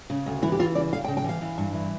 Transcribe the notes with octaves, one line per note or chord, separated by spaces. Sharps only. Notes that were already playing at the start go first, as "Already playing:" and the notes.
C#3
D2
E3 E4
G4
E3 F4
C#3 D5
D2 F5
G5
C#3
G5
E3 F5
E3
G2
E3